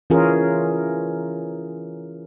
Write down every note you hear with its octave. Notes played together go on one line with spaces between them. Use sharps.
E3 C#4 F4 G#4 A#4